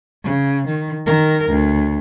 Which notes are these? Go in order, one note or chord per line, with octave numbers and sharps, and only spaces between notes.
C#3
D#3
D#3 A#4
D2